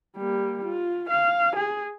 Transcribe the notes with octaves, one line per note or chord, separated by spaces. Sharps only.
G3 A#3
F4
F5
G#4